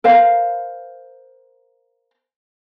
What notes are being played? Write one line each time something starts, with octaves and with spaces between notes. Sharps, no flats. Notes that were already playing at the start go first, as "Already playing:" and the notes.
A#4 C5 F5